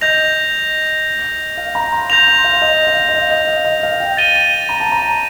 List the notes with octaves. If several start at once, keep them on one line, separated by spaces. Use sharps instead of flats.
D#5 G6 A#6 F7
F5
A#5
C6
C6 G6 A#6 F7
C6
F5
D#5
F5
D#5
F5
D#5
F5
D#5
F5
G5
A6 D#7 G7
A#5
A5
A#5